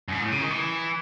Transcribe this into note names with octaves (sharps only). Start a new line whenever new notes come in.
F#2
G#2
A2
C#3
D#3
E3